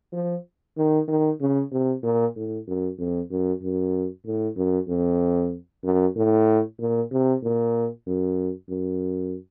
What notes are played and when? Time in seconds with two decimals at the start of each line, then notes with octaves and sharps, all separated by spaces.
0.13 F3
0.77 D#3
1.08 D#3
1.41 C#3
1.72 C3
2.04 A#2
2.36 A2
2.68 F#2
2.98 F2
3.30 F#2
3.63 F#2
4.26 A2
4.57 F#2
4.88 F2
5.84 F#2
6.16 A2
6.79 A#2
7.12 C3
7.43 A#2
8.07 F#2
8.69 F#2